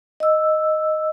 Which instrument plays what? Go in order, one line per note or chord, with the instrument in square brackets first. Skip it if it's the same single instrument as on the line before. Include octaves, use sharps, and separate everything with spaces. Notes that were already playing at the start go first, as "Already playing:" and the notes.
[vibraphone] D#5 E6